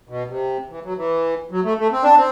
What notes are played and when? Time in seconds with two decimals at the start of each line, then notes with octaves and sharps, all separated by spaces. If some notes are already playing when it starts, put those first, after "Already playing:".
0.09 B2
0.29 C3
0.70 E3
0.84 F#3
0.97 E3
1.51 F#3
1.64 A3
1.78 A3
1.92 C4
2.03 D4
2.16 C4